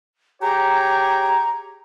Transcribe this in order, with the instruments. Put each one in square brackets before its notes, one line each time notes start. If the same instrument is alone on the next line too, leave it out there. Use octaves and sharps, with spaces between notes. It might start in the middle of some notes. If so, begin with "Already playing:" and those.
[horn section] G4 G#4 C#5 [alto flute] A#5